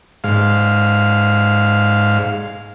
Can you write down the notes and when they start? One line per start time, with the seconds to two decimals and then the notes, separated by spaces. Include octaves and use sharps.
0.24 G#2 F5